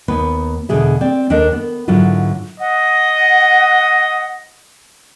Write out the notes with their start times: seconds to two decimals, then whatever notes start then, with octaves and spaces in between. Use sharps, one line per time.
0.08 D#2 B3 D#4 B4
0.69 E2 B2 D3 G#4 E5
1.01 C4 D5
1.30 D#2 D4 A4 A#4 D#5
1.52 B3
1.88 G#2 D3 F#3 E4 F4
2.60 D#5 F#5